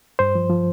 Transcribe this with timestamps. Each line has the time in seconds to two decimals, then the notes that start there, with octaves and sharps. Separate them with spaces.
0.19 G2 C5
0.35 F3
0.50 F3